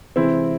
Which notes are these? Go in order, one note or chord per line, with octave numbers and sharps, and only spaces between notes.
C3 E3 G#3 C4 E4